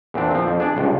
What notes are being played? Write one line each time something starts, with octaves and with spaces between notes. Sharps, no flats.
E2 A#2 C4 D4
F3 C4
F2
D4 G#4 D5
C#2 G2